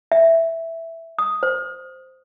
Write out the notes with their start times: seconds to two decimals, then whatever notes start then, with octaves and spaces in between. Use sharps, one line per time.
0.12 E5
1.19 D#6
1.43 C5